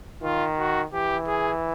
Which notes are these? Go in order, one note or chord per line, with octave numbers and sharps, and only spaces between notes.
D#3 F4
F#4
E3 G4
G#4